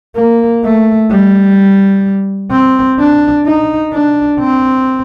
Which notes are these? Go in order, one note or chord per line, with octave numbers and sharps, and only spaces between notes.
A#3
A3
G3
C4
D4
D#4
D4
C4